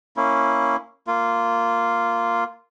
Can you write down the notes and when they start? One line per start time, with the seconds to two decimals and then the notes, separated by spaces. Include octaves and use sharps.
0.17 A#3 C#4 E4
1.07 A#3 F4